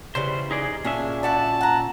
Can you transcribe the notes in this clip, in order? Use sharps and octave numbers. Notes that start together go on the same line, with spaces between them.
C#3 E3 G3 C5
D#4 G#4 D5
A#2 C#4 D4 G#4 E5
E4 F#4 D5 A5
F#5 A#5